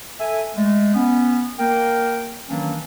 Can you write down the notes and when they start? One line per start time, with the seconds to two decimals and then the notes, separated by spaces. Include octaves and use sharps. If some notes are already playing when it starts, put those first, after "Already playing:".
0.20 A4 E5 G#5
0.56 G#3 A3
0.94 B3 C#4
1.59 A#3 A#4 G5
2.49 D#3 E3 F#3 A#3 C#4 D4